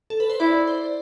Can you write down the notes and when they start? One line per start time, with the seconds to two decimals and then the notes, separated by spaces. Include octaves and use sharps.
0.10 A4
0.20 B4
0.30 C5
0.40 E4 D5
0.67 C5